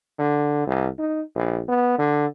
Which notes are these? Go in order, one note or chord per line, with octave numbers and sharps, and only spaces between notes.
D3
C2
D#4
A#1
B3
D3